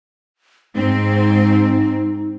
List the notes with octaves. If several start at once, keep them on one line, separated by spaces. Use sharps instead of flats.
G#2 C4 D#4